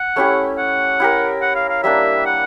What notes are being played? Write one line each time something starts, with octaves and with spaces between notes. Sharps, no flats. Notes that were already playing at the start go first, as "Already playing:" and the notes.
Already playing: F#5
A3 C#4 E4 G4
F#5
E4 G4 A#4
F#5
F5
F5
G3 A#3 D4 E5
F#5